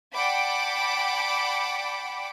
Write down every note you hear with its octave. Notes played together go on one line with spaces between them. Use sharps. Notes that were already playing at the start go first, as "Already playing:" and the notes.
D5 F#5 G5 A5 B5 D6